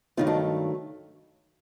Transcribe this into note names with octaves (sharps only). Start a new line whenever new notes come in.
G2 D#3 F#3 A3 D#4 F4
D4